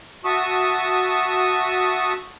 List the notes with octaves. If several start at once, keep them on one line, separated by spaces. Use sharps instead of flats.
F#4 E5 A5 C#6 D#6